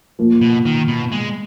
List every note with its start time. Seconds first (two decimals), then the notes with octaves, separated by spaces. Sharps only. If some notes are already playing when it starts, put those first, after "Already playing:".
0.19 A#2 F3 A#3
0.41 B2
0.65 D#3
0.88 B2
1.12 G#3